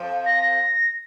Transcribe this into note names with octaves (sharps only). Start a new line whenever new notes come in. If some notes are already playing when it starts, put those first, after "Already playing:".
Already playing: F2 F3
A#6